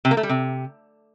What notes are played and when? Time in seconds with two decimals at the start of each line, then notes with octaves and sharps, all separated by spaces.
0.05 C3
0.11 A#3
0.17 A3
0.23 G3
0.29 C3